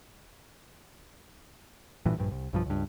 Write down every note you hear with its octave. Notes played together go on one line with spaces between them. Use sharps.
A1 G2 A#2 E3
A#1 G2
C2
B1 G2 F3
C#2 G2